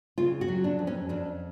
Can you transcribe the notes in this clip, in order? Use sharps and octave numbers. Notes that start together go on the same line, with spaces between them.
C#3 F4
F#4
F#3
D4
F2
C#4
F2 D4